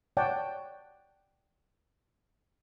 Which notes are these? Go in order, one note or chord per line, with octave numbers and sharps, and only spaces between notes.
C#5 D5 F#5 G5 A5